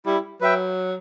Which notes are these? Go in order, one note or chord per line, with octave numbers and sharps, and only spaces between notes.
G3 E4
F#3 B4 E5 G5